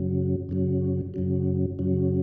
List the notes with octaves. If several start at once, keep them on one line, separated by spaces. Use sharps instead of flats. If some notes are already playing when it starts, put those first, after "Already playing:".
Already playing: F#2 C#3 F#3
F#2 C#3 F#3
F#2 C#3 F#3
F#2 C#3 F#3